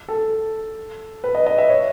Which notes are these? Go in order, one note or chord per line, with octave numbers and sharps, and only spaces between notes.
A4
B4
D#5
D#5
E5
C#5